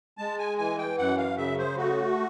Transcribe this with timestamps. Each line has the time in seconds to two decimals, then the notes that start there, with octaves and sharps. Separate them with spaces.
0.18 G#3 A5
0.39 G#5
0.58 E3 G#5
0.78 G5
0.98 F#2 F#5
1.18 F5
1.37 C#3 E5
1.58 C5
1.77 A3 F#4